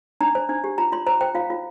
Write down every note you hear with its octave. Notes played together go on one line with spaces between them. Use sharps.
D4 A#5
C5
D4
G4
F4 A#5
F4 C6
C5 A#5
C5 G5
F4 F5
F4